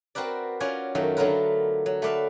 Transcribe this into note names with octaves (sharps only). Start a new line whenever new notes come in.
C4 F#4 A#4 B4 D5
C#4 F4 F#4 D5 G#5
F#2 D#3 F#3 A3 F4
D3 F#3 A3 F4 A#4 B4
F#3
A3 B4 D5 E5 F5